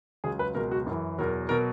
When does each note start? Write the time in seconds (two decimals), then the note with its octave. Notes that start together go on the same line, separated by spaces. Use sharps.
0.24 C#2 C#3 F#3 G#4
0.39 B4
0.55 C#2 B2 F#3 A#4
0.71 F#4
0.86 F#2 E3
1.18 E2 B2 F#3 A#4
1.49 B2 F#3 A#4